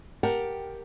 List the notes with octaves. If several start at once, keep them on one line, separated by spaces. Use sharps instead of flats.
G4 A#4 F#5 G5 A5